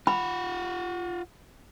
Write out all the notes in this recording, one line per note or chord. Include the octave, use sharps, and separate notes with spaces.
F4 F#5 B5